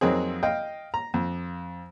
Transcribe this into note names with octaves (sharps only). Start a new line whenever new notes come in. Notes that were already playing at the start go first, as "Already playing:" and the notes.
F2 F#3 A#3 C4 D#4 G#4
D#5 F5 G5
A#5
F2